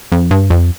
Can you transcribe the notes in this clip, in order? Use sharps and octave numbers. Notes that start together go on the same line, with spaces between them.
F2
G2
F2